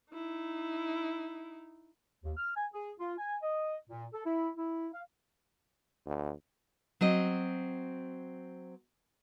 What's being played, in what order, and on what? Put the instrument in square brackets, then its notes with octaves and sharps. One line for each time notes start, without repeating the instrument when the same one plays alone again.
[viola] D#4 E4
[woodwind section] D#2
F6
G#5
G#4
F4
G#5
D#5
A#2
A4
E4
E4
F5
[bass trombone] D2
[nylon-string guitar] F#3 C4 D#5